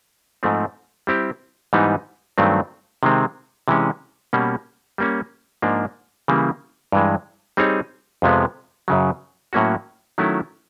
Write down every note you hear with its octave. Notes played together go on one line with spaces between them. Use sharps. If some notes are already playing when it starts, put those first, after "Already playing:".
G#2 F3 A3 C4
G3 C4 E4 G4
G#2 E3 G3 B3 D#4
G2 D#3 F#3 A3 C4
C3 D#3 G#3 C4
C3 E3 G#3 C#4
B2 G3 A#3 C#4
G3 A#3 C#4
G#2 F3 A#3 D4
C#3 E3 G3 A#3
G2 E3 G#3
G3 C4 D#4 G#4 C#5
F2 C3 F3 G#3 B3
F#2 C#3 F#3
A2 F#3 A#3 C#4 F#4
D#3 F#3 A3 C#4 E4